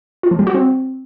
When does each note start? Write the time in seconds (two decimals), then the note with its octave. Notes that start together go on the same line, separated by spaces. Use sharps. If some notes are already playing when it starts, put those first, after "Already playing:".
0.23 F4
0.31 F3
0.39 G3
0.47 F#4
0.55 C4